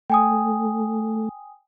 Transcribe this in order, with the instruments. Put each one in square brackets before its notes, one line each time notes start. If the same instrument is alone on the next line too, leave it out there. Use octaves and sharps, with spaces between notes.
[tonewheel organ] A3 [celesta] G5 G#5 D#6